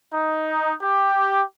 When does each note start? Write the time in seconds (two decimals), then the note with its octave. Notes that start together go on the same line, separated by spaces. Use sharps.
0.14 D#4
0.82 G4